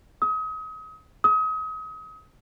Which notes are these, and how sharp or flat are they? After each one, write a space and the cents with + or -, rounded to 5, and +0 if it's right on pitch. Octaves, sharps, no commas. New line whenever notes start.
D#6 +35
D#6 +35